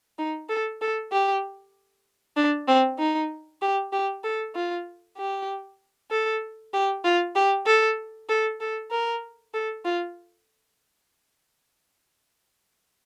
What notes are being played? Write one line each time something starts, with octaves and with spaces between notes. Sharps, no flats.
D#4
A4
A4
G4
D4
C4
D#4
G4
G4
A4
F4
G4
A4
G4
F4
G4
A4
A4
A4
A#4
A4
F4